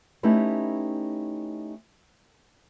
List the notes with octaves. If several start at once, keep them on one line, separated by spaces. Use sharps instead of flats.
A3 C#4 D#4 E4 G4 B4